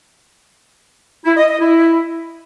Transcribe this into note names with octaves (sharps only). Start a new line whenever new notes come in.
E4
D#5
D#5
E4